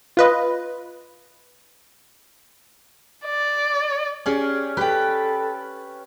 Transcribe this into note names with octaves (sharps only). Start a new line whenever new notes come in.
F4 B4 D#5
D5
C#4 G4 G#4 D5
G4 A4 B4 G5